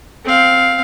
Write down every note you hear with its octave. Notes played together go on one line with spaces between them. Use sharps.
C4 F5